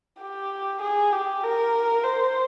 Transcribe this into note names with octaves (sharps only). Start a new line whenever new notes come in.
G4
G#4
G4
A#4
C5